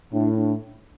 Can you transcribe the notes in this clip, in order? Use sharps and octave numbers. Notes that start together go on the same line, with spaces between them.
A2 D4
D4